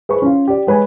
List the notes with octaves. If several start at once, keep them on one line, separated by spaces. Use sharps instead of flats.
G#4 B4 C5 C#6
C#4 F4
G4 D5
G#3 B4 C#5 G#5